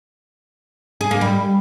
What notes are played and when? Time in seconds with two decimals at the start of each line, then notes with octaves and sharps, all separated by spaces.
1.01 G#4
1.11 A#3
1.21 G3